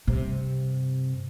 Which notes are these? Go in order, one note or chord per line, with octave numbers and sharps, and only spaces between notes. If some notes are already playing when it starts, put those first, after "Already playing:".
G2 C3